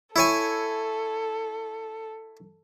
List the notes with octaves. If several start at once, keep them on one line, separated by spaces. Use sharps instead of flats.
E4 A4 C#5 G#5